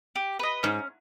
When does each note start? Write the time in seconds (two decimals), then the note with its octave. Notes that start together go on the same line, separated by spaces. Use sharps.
0.16 G4
0.39 B4 D#5
0.63 G#2 C#4